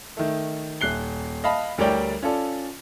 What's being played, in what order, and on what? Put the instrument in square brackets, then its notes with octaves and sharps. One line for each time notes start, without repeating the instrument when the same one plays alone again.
[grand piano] D#3 A3
D#1 F#6 C7 G7
D#5 F5 A5 B5
D2 G3 A#4 C#5 D5 G5
C#4 F4 A4 D5